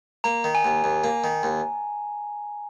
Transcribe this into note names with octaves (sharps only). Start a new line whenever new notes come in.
A#3 A#5
D#3
G#5
D#2
D#2
A#3
D#3
D#2